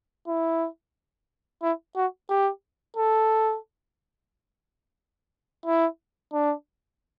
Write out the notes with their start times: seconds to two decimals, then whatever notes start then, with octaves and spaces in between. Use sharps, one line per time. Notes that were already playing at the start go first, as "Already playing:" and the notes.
0.27 E4
1.62 E4
1.96 F#4
2.30 G4
2.97 A4
5.66 E4
6.33 D4